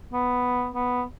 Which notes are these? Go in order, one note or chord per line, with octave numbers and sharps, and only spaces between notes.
B3
B3